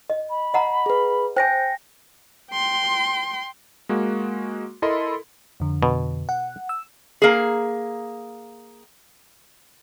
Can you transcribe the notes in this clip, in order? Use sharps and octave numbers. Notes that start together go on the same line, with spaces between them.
D#5
B5
D#5 F#5 A#5
G#4 B4
C5 G5 G#5 G6 A#6
G5 C6
G#3 A#3 F#4
E4 A4 A#4 D#5 B5 C6
F2 D3
B2
F#5
E6
A#3 G#4